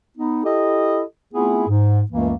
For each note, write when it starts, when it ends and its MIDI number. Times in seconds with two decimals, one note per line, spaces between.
0.17 0.44 59
0.17 0.44 63
0.44 1.02 64
0.44 1.02 67
0.44 1.02 69
0.44 1.02 75
1.33 1.65 57
1.33 1.65 59
1.33 1.65 60
1.33 1.65 64
1.33 1.65 65
1.33 1.65 68
1.67 2.01 44
2.11 2.33 37
2.11 2.33 42
2.11 2.33 52
2.11 2.33 57
2.11 2.33 58